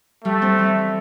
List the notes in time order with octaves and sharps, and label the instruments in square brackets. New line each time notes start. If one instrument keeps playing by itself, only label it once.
[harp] G3 [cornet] A3
[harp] C4
E3